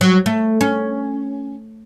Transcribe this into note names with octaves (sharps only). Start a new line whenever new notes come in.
F#3
A3
C#4